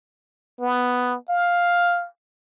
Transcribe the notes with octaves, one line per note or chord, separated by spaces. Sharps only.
B3
F5